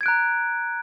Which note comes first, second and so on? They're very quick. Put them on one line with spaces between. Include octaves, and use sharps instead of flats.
G#6 D7 F#6 A#5